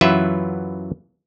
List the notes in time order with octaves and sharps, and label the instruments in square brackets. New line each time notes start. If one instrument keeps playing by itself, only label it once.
[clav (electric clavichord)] F#2 E3 F#3 F4 B4 E5